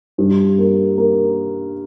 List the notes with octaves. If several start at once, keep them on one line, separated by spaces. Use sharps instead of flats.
G2
A#3
A#3